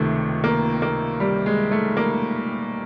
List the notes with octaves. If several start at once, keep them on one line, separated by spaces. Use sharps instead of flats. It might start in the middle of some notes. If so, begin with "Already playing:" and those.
Already playing: C#2 C3 D#3 A3
A#3
A#3
G3
G#3
A3
A#3